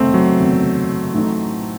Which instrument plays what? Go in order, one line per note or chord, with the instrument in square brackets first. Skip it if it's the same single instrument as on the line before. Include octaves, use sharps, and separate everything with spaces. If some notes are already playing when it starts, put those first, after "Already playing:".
Already playing: [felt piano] F#1 E2 C3 D#3 [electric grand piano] A3 C4
[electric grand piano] F#3
[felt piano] F#1 E2 C3 D#3
A1 A2 E3 A3 D#4